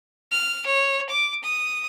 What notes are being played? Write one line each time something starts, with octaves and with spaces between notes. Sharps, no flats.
F6
C#5
D6
D#6